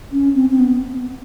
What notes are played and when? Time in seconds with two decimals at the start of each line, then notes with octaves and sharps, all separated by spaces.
0.12 C#4
0.35 C4
0.50 C4
0.59 B3